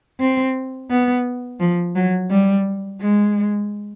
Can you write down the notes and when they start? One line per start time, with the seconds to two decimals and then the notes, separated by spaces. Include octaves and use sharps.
0.20 C4
0.90 B3
1.60 F3
1.96 F#3
2.31 G3
3.01 G#3